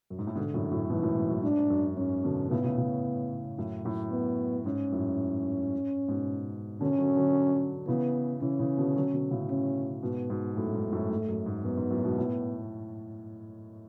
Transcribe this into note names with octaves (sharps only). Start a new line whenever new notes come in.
F#2
G#2
A2
G#2 B2 D3
F#2 A2
F#2 A2
G#2 B2 E3
F#2 A2
G#2
F#2
G#2 D4
F#2
G#2 C#4
B2 D3
A2 C#3 B3
A2 C#3
A2 C#3
F#2 A2
F#2 A2
B3
G#2 C#4
F#2 A2
G#2 B2
B2 D3 C#4
D3 F#3
D3 F#3
C#3 E3 B3
C#3 E3 C#4
C#3 E3
B2 D3
D3 F#3
B2 D3
A2 C#3
C#4
G#2 B2 B3
G#2 B2
F#2 A2 A3
G#2
F#2 A2
G#2
F#2
G#2
F#2 B3
G#2
F#2 A2
G#2 B2
A2